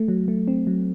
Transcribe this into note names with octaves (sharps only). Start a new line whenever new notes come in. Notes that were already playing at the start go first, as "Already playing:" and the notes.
Already playing: A3
F#3
A3
C4
F#3